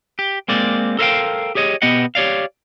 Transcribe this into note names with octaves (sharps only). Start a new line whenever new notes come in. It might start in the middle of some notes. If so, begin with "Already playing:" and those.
G4
G#3 A#3 C4 D5
A4 A#4 C5 D5 F5 G5
G4 G#4 C#5 D#5
B2 B3 G4 D#5 F#5
G4 C#5 D5 F5